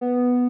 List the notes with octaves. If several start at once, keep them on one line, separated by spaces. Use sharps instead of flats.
B3